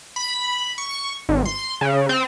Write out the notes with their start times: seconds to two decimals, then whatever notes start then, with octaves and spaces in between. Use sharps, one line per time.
0.16 B5
0.78 C#6
1.29 G#1
1.45 C6
1.81 C#3
2.09 C4